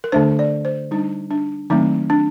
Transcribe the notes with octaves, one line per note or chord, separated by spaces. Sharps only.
A#4
D3 A3 D4 C5
D5
C5
G3 D4 D#4
D4
D#3 F#3 A3 C4 D#4
D4